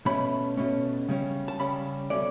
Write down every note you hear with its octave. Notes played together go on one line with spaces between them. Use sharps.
B2 A3 C#4 B5
B2 A3 C#4
C#3 G3 C#4
A5
C#3 G3 C#4 B5
B2 A3 C#4 D5